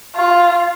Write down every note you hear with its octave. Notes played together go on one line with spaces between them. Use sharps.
F4